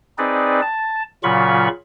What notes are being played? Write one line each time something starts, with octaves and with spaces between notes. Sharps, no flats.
C4 D#4 G#4 B4 D5
A5
A#2 C#3 F#3 F4 B5 C#6